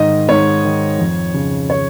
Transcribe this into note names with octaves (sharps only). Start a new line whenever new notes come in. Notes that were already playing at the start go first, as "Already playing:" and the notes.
Already playing: G#2 D#3 D#5
G#2 C#5
D#3
F2
C#3
C#5